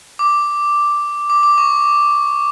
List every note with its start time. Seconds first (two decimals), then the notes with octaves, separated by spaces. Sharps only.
0.19 D6
1.30 D6
1.43 D6
1.58 C#6